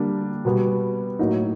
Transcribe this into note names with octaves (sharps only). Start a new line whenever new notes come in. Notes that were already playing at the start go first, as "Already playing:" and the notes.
Already playing: D3 G3 A#3 D4
B2 G3 B3
A2 F#3 A#3 D#4